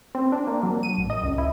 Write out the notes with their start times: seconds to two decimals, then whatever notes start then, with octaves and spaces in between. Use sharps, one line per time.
0.15 C4
0.32 D4
0.47 A#3
0.63 F#3
0.83 D#7
0.97 A1
1.10 D#5
1.23 C#2
1.38 E4